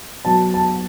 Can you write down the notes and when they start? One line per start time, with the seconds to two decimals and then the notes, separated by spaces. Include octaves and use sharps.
0.25 B2 F#3 A5
0.54 A5